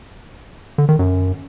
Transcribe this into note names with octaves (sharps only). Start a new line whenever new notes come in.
D3
D#3
F#2